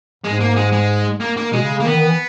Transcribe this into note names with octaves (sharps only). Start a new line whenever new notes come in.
G#2 G#3
A#3
G#3
G#3
A#3
A#3
B2 G#3
C#3
C#3
A#3
D#3 B3
D#3
E3